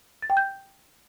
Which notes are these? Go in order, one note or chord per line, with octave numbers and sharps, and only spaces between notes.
A6
G5
G6